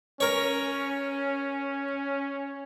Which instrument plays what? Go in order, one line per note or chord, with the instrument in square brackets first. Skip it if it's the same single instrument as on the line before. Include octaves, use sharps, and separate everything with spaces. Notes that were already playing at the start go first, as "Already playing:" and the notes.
[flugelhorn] C#4 [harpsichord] A#4 C#5